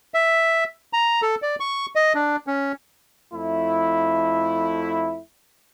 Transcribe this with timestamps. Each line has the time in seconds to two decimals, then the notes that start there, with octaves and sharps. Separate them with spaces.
0.14 E5
0.93 A#5
1.22 A4
1.42 D5
1.60 C#6
1.95 D#5
2.14 D4
2.47 C#4
3.33 F2 A3 E4